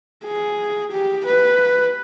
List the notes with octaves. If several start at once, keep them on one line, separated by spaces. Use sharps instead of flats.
G#4
G4
B4